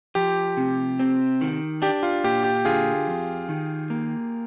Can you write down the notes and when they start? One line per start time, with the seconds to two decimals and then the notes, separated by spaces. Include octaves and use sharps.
0.15 F3 G4
0.57 C3
0.99 C4
1.41 D#3
1.82 D4 G4
2.03 F4
2.24 A#2 G4
2.44 G4
2.65 D3 F4 G#4
3.08 F2
3.49 D#3
3.90 A#3